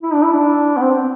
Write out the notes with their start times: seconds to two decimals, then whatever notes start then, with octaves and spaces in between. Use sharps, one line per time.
0.03 E4
0.13 D4
0.23 E4
0.33 D4
0.77 B3
0.81 C4